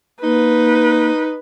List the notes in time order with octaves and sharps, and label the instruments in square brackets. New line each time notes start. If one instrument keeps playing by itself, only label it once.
[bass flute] A#3 [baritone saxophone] D#4 [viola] B4